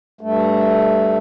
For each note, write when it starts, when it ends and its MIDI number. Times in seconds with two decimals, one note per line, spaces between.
0.21 1.18 43
0.21 1.18 57